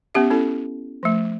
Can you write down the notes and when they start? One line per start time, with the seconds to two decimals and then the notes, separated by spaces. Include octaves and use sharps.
0.15 B3 C#4 G4 E5
0.30 C#4 E4 A4
1.03 F3 A3